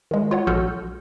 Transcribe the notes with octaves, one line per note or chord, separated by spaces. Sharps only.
D#3 G#3
F4 C#5 F#5
A#1 F#4 A4 F6 G6 C#7